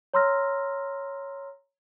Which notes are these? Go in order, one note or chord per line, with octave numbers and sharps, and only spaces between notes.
C#5 A#5 C6 E6 F6 A#6